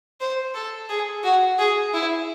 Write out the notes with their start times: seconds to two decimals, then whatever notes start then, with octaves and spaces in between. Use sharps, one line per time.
0.20 C5
0.55 A4
0.89 G#4
1.24 F#4
1.59 G#4
1.94 E4